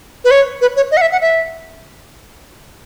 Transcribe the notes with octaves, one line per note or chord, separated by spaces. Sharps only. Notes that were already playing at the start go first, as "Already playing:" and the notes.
B4
C#5
B4
C#5
D#5
F#5
E5
F#5
E5